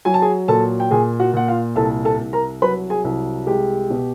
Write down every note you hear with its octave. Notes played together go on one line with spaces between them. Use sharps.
F#3 G#5
A5
G#4 G#5
A#2 A4 A5
G5
A#2 G#4 G#5
F#4 F#5
A#2 F#5
F4 F5
C2 A4 A5
A4 A5
C2
A#4 A#5
F#3 B4 B5
G#4 G#5
C2
G#3 G4 G5
B2